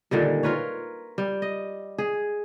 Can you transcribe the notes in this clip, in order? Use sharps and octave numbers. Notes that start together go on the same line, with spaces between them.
A#2 D3 D#3 G3
F4 A#4 B4 C#5
G3
D#5
G#4